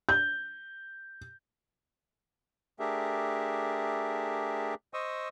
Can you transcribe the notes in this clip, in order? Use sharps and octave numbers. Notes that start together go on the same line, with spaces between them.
G6
A3 D4 G4 G#4 A#4 E5
C5 D#5 C#6 D#6 E6